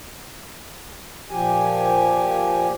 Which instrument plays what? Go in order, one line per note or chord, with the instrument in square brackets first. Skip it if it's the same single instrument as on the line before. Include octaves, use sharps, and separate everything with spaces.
[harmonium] A#2 F3 G4 G#5